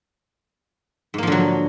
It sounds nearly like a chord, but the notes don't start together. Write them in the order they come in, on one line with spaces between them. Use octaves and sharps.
G#2 A#3 F3 D3 F#3